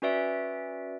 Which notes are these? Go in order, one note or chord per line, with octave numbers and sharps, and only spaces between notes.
C#4 F#4 B4 D5 E5 D7